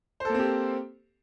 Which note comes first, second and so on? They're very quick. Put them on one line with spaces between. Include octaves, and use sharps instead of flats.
C5 A4 A#3 C4 G4